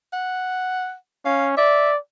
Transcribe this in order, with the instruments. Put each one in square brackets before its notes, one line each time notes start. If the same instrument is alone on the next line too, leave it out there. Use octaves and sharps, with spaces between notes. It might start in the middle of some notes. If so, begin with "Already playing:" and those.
[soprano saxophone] F#5
[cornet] C#4 [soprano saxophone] F5
[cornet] D5 [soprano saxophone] E5